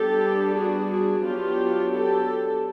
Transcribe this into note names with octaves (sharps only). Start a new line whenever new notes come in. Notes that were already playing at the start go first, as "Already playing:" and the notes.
Already playing: G3 B3 D4 G4 A4
F#4 G#4
F#4 G#4
F#3 B3 D4 F4 G4
G4 A4